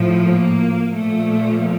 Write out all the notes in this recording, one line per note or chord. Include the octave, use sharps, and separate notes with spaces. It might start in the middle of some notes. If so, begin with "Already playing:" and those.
Already playing: A2 F3
A#3
A#2 F3 A3